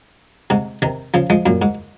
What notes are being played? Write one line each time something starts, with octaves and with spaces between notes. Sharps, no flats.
G#2 C3
C3 D#3
C#3 F3
F3 G#3
F#2 A#2
G#2